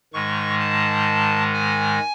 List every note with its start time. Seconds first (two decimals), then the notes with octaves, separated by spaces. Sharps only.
0.13 G#2 D#3 G#3 C#6
0.60 A5
1.53 G#5